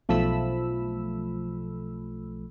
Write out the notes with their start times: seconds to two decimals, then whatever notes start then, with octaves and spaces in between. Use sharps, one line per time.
0.09 B1 F3 A3 A4 B5 E6